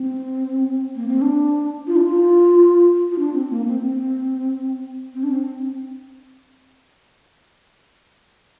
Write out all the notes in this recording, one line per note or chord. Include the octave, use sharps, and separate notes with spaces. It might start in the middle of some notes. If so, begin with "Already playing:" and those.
Already playing: C4
A#3
C4
D4
F4
D4
F4
F4
D4
C4
A#3
C4
C4
C4
D4
C4